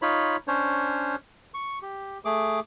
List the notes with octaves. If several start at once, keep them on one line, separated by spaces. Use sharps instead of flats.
D#4 F4 C#5 B5
C#4 D4 C5 C#5
C#6
G4
A3 G#4 D6